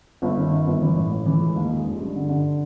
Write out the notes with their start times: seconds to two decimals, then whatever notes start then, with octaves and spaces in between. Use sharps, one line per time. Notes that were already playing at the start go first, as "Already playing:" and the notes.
0.22 G1
0.37 D#3
0.52 D#3
0.67 G1
0.82 E3
0.97 A2
1.10 A2
1.26 E3
1.40 G#3
1.56 D#2
1.70 G#3
1.86 F1
2.00 G2
2.15 D3
2.29 D3